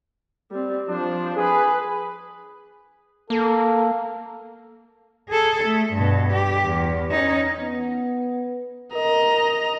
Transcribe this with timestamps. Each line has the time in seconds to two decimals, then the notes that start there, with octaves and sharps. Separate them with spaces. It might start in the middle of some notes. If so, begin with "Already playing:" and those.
0.51 G3 C4
0.88 F3 D4 C5
1.36 G#4 B4
3.30 A#3 A4
5.29 G#4 A4
5.65 A3
5.93 G2 B2
6.33 G4
6.64 E2
7.11 C#4 D#4
7.61 B3
8.94 A#4 D#5 A#5